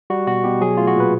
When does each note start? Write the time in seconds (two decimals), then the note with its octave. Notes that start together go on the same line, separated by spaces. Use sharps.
0.10 G3 F#4
0.27 B2 F#4
0.44 B2 G4
0.61 F#3 G#4
0.77 A3 F4
0.87 F#4
0.96 A#2 B4